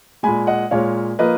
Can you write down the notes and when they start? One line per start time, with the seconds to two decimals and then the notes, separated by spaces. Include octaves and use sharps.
0.23 A#2 G#3 G#5 B5
0.47 D#5 F#5
0.71 A#2 G#3 C#5 F5
1.19 F3 A#3 B4 D#5